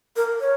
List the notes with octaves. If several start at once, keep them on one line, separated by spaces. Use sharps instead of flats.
A#4
C#5